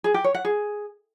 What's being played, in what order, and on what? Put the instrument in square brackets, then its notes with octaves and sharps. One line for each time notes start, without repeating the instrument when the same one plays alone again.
[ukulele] G#4
G4
C#5
F#5
G#4